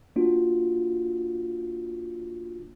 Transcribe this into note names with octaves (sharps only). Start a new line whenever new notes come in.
A#3 D4 F4 F#4